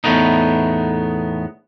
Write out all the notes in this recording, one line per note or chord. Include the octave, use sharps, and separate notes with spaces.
E2 A2 A3 B3 D#4